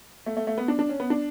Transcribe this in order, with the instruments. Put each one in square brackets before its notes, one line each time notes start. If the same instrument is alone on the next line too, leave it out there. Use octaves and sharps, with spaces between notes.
[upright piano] A3
A3
A3
B3
D4
D4
C#4
B3
D4